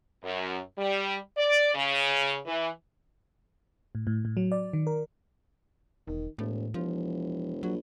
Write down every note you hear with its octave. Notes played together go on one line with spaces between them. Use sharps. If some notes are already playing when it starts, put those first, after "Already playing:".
F#2
G3
D5
C#3
E3
A2
A2
A2
F#3
D5
D#3
A#4
E1 D#3
E1 A2
E1 F3
A#1 F#3